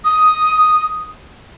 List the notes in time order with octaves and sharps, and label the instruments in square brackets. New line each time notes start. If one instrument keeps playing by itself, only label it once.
[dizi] D#6